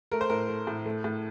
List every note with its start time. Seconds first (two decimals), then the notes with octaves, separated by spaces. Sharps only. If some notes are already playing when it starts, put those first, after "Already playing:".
0.11 A3 A#4
0.21 C5
0.30 A2 A#4
0.49 A3
0.67 A2
0.86 A3
1.04 A2